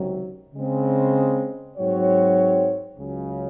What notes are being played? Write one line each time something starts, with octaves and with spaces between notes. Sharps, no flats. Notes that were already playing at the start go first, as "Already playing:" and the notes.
Already playing: C#2 C3 D#3 F#3
C#3 G#3 C4
G#2 F#3 C4 F#4 C#5
C#2 C#3 F#3